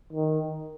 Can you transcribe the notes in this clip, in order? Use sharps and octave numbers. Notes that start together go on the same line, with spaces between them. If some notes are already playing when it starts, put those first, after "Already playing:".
D#3